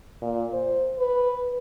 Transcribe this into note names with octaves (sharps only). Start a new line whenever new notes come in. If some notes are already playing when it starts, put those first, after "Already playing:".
A#2
C5
B4